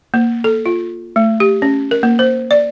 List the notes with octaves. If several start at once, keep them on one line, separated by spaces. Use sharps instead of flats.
A#3
A4
F4
A3
G4
C#4
A#4
A#3
C5
D5